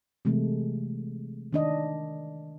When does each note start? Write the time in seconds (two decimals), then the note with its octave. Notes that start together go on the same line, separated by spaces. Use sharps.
0.25 C3 E3 G#3 A3
1.53 D#3 D4 D#5